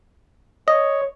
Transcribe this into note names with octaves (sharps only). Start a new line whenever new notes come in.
C#5 D#5